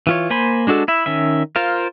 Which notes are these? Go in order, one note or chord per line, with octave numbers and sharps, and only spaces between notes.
E3 F4 C#5
A#3 C5 G#5 B5 C6
G#3 D4 F#4 A4
E4 E5
D#3 C#4 E5
F4 A#4 C5 F5